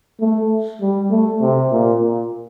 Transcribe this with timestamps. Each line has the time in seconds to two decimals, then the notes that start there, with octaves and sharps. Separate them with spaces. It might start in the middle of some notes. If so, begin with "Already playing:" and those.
0.20 A3
0.81 G3
1.11 A3
1.41 C3
1.71 A#2
2.01 A#2